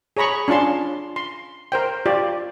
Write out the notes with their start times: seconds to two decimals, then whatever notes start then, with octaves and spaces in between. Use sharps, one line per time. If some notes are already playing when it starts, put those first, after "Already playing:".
0.17 G#4 C#5 A#5 B5 C#6
0.48 C#4 D4 F4 A5 C6
1.16 C6
1.72 A#4 C5 G5
2.06 F4 G4 D5